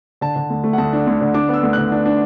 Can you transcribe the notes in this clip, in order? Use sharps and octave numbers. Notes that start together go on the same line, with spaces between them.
D3 A5
D3
D2
A3
F#5
D2 A5
D4
D2
D3
D4 D6
B3
E6
D2
D3 F#6
D4
D4